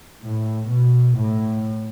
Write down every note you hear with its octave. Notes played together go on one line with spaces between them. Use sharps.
A2
B2
A2